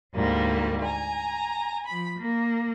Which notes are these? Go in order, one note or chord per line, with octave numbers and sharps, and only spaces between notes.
D2 G#2 G3 A#3
G#5 A#5
F3 B5
A#3